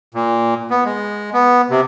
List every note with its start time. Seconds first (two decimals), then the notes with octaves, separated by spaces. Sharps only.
0.14 A#2
0.70 B3
0.85 G#3
1.33 B3
1.70 C3